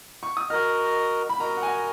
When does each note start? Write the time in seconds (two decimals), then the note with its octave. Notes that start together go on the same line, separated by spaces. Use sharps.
0.23 C#6
0.37 D#6
0.50 F#4 A#4 D#5 F6
1.29 B5
1.40 F#4 A#4 D#5 A#5
1.57 F#5
1.63 G#5